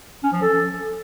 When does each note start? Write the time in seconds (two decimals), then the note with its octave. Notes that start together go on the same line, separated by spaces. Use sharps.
0.23 C#4
0.32 F3
0.42 A4